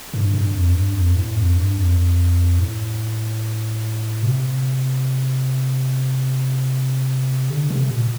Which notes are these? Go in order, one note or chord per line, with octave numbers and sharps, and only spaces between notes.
G2
G2
F2
G2
F2
A2
F2
G2
F2
A2
C3
D3
C3
A#2